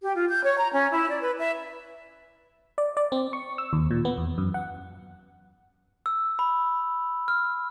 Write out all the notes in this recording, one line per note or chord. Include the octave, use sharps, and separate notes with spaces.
G4
F4
G6
C#5
A#5
C#4
E4
D5
B4
E5
D5
D5
C4
C#6
E6
D#2
A#2
B3
E2
F#2
F#5
E6
B5
F6